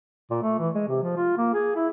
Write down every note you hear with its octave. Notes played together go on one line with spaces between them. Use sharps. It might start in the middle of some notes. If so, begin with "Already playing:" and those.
A#2
A3
E3
G#3
C3
F3
F4
A#3
G#4
E4